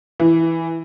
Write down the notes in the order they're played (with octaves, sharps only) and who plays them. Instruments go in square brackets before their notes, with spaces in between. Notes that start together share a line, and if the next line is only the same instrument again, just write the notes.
[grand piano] E3